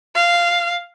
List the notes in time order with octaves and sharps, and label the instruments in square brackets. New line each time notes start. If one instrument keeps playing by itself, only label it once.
[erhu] F5